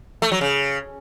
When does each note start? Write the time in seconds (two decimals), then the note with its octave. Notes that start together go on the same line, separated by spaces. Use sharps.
0.22 A3
0.32 F#3
0.41 C#3